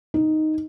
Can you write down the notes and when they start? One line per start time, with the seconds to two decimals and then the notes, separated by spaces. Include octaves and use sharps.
0.14 D#4